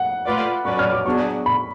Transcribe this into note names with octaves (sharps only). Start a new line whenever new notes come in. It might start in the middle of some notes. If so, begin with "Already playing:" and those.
Already playing: F#5
A3 F4 B4 D5
F#3 C#4 F#4 B4 D5 C#6
F6
D6
F#3 B3 D4 G#4 C#6
B5